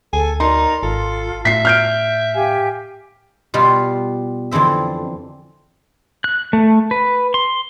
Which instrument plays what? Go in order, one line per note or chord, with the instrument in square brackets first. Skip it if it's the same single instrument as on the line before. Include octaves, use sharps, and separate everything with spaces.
[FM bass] D2 [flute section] A4 [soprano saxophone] G#5
[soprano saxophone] D#4 [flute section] A#4 D5 A#5 [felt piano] C6
[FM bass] G#1 [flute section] F4 [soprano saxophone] A4
[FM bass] A2 [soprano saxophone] E5 [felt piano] B6 C7
[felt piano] F6 G6 D7
[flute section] G4 F5 G#5
[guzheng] B2 G3 F4
F2 D3 E3 C4 E5
[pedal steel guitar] F#6
A3
B4
C6